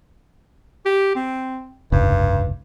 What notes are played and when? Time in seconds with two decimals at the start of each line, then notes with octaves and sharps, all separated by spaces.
0.85 G4
1.15 C4
1.92 F1 C#2 G2